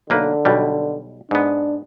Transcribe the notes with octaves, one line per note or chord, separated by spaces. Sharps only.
B1 D3 A#3 B4
B1 B2 G3
G#2 B3 D4